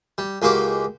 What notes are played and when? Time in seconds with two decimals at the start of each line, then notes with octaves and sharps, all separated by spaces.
0.18 G3
0.42 C#2 G#3 A#3 F#4 G4 D6